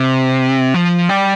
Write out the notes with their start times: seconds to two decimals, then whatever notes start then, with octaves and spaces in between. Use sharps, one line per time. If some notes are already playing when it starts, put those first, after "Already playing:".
Already playing: C3
0.74 F3
1.09 G3